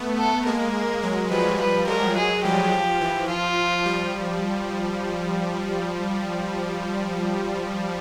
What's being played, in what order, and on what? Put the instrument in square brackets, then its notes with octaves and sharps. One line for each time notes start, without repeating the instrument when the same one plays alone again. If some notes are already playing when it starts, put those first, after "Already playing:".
Already playing: [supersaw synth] A3 B3
[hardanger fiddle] A4
[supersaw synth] G#3 A#3 [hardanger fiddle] A#4
[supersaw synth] F#3 G#3
[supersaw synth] F3 G3 [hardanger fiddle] B4
[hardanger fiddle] B4
[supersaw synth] F#3 G#3 [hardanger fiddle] A#4
[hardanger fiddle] G#4
[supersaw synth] F3 G3 [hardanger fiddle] G4
[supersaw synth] F3
E3
[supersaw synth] F3 [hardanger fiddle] F4
[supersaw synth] F3 G3